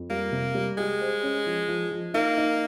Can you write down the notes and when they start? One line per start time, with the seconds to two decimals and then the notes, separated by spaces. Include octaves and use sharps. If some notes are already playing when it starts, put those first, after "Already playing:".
Already playing: F2
0.10 G3 A#3
0.32 C3
0.55 G3
0.78 G#3 G4
1.01 C5
1.23 C#4
1.46 F3
1.68 F3
1.91 F3
2.14 A#3 D#4
2.37 D#4